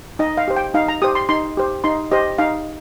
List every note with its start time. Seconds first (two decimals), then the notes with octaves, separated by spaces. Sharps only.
0.19 D#4 D#5
0.37 F5
0.48 G4 C5
0.57 G5
0.74 D#4 F5
0.88 A#5
1.02 G4 C5 D#6
1.15 C6
1.29 D#4 C6
1.57 G4 C5
1.84 D#4 C6
2.11 G4 C5 D#5
2.38 D#4 F5